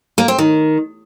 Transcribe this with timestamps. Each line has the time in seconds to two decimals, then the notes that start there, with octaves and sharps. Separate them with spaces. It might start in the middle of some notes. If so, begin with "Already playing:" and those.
0.18 A#3
0.28 C4
0.38 D#3